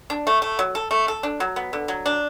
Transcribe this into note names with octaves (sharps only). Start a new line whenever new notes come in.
D4
A3
A3
F#3
A4
A3
A4
D4
F#3
B3
D3
F#3
D4